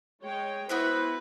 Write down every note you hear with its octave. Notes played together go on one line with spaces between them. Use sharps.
G#3 C#5 G5
B3 E4 F#4 B4 C5 E5